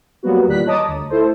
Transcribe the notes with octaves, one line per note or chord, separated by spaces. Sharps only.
F#3 G3 A#3 B3 F#4
E2 A#2 D#3 G3 F#6 B6
C#5 D#5 A5 A#5 D6 D#6
D2
A3 E4 A4 C5